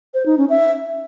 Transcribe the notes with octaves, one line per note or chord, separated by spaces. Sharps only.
C5
D#4
C#4
E5